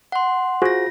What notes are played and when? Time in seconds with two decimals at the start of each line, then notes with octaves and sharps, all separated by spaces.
0.12 F#5 C6
0.62 F4 F#4 G#4 C5 A#6